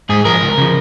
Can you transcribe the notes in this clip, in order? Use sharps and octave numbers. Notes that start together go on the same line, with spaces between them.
G#2 G#4
F3 A#4
C#2
C#3 F3